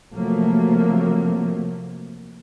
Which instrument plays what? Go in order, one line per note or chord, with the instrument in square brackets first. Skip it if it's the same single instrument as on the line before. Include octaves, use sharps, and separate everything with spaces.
[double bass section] C3 F3 F#3 A3 A#3